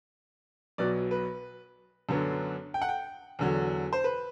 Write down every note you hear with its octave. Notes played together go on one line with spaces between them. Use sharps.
B1 B2 F#3 B3 D5
B4
F#2 D3 F#3 B3 D4
G5
F#5
G5
E2 D3 F#3
C5
B4